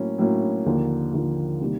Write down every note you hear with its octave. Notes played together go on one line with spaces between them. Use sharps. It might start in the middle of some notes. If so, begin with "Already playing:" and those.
Already playing: A2 F#3 A#3 C#4
A2 F#3 A#3 C#4
D#2 D3 F3 A#3
D#2 D3 F3 A#3
C3 D#3 G3 A#3